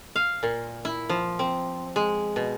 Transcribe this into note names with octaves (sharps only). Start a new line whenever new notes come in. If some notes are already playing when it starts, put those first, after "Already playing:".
F5
A#2
E4
F3
C4
G#3
B2